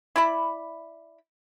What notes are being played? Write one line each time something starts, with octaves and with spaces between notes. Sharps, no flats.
E4 D5 B5